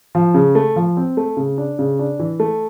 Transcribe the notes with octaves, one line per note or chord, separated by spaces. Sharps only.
F3
C#3
A3
F3
C4
A3
C#3
D4
C#3
D4
E3
A3